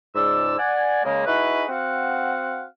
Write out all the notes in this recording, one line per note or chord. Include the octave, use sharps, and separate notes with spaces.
C#2 G#2 D5 E6
D5 F#5 G#5
C#3 G#3 A#3
D#4 E4 F#4 G#4 B4
C4 F#4 F5 F#5